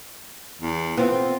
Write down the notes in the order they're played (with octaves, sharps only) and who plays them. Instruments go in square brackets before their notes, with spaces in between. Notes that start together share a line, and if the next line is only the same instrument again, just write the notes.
[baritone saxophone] E2
[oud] B3 C4 [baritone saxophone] F4